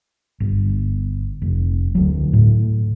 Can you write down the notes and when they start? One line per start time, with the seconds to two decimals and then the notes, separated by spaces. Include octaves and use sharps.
0.40 G1
1.42 F1
1.95 D2 F#3
2.33 A2